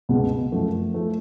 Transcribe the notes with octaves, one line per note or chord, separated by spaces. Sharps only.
C#2 B2 G#3 B3
F#2 F3 A3
F3 A3